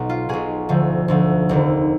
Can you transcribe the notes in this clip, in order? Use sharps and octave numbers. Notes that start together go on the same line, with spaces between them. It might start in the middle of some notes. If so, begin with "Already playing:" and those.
Already playing: B1 B2
F4
B1 B2 G#4
D2 D3 F3
D2 D3 F3
F1 D#2 D3